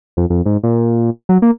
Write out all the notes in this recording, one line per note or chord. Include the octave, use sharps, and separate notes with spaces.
F2
F2
G#2
A#2
F#3
A#3